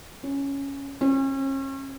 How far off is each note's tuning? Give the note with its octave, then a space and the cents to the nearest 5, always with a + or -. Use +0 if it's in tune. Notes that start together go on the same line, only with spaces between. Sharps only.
C#4 +0
C#4 -40